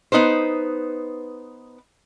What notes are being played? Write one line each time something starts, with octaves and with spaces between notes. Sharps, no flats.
B3 D#4 B4 C5